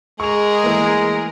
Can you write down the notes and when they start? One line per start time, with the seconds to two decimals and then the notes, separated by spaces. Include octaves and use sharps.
0.20 G#3 G#4 A#4 C#6 F7
0.64 E3 A3 A#3